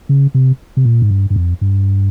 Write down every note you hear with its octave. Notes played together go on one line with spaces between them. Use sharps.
C#3
C3
C3
A#2
G#2
G2
G2
F2
G2